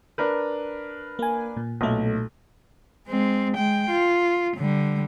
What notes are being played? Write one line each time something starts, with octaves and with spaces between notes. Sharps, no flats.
D4 A#4 B4
A#3 G#5
A#2
B1 A#2 A3
G#3 C4
G#3 G5
F4
D3 G3